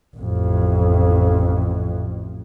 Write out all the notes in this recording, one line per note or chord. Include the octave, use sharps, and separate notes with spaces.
A1 F2